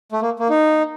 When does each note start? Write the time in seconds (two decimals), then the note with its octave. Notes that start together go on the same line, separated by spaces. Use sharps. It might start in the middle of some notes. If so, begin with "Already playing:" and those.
0.12 A3
0.22 A#3
0.40 A#3
0.49 D#4